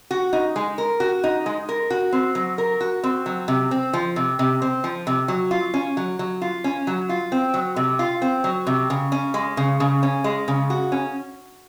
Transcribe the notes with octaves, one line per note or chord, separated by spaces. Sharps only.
F#4
D#4
G#3
A#4
F#4
D#4
G#3
A#4
F#4
C4
F#3
A#4
F#4
C4
F#3
C3
C4
F3
C3
C3
C4
F3
C3
F#3
F4
C#4
F#3
F#3
F4
C#4
F#3
F4
C4
F#3
C3
F4
C4
F#3
C3
C#3
C#4
G#3
C#3
C#3
C#4
G#3
C#3
F#4
C#4